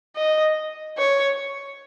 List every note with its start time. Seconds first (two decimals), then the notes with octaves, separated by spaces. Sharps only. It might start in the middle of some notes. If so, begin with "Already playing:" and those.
0.16 D#5
0.98 C#5